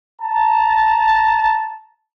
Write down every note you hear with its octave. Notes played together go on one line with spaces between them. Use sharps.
A5 A#5